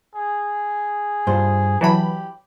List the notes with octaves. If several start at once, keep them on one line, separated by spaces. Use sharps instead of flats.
G#4
G2 F4 C5
E3 F#3 G4 A5 B5